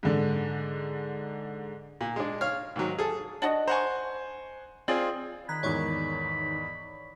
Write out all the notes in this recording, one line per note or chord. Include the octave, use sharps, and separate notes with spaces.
G#2 D3
A#2
G#3 D4
C#5 F5 F6
G#2 D#3 F#3
G#4 A4
D4 F#4 D#5
C5 F#5 G#5 A#5 C#6
C4 F4 G#4 D5
D#3 A#5 B5 F#6 G#6
E2 G#2 C#5 D5 C#6